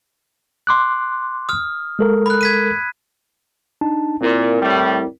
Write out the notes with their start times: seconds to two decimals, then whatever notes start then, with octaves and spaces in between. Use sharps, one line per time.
0.67 C6 D6 F#6
1.49 D#6 F6
1.99 G#3 A4 A#4
2.26 B5 F#6
2.41 G#6 B6 D#7
3.81 D4 D#4 A5
4.21 A#2 C4 E4 A#4
4.61 A2 G3